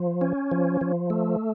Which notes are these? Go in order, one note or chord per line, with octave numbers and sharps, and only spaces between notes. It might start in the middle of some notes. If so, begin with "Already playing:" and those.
Already playing: F3
C#4
F3
F3
A3